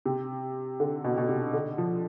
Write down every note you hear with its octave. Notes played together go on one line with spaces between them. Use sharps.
C3
D3
B2
B2
C3
D3
F3